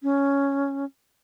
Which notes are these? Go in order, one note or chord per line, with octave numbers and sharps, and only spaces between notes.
C#4